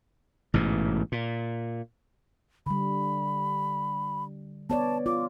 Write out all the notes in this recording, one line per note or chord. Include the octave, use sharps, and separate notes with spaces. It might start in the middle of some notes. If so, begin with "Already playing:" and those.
A1 G#2 B2
A#2
D3 G3 B5
B3 C#5 D5 A5
F4 D6